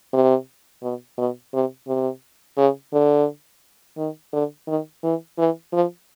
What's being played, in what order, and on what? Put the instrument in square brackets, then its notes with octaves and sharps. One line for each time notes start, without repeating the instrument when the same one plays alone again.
[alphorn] C3
B2
B2
C3
C3
C#3
D3
D#3
D3
D#3
E3
E3
F3